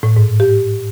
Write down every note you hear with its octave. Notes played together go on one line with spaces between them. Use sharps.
A2
G#2
G4